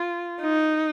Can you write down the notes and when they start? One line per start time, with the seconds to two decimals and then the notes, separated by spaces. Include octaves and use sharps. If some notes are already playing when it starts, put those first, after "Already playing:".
Already playing: F4
0.42 D#4